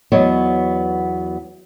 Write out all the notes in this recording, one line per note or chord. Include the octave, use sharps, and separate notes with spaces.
E2 F#3 B3 C#5 D#5